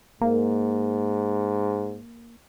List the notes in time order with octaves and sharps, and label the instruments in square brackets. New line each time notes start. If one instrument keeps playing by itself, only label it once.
[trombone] G#2 [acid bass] A#3